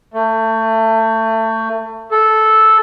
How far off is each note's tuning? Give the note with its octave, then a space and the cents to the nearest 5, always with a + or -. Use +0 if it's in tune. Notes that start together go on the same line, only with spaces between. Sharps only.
A3 +25
A4 -10